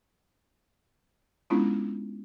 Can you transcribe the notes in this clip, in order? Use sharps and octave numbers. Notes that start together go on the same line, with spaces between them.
G#3 B3 C#4 D4 E4 F4